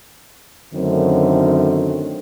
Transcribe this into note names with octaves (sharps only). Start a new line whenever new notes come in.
F#2 D3 D#3 A3 C4